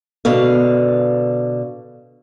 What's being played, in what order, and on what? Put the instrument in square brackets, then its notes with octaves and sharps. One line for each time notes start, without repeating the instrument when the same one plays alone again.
[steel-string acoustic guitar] B2 D3 F5